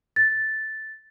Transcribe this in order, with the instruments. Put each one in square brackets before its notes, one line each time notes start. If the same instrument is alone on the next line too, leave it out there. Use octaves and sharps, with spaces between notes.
[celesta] A6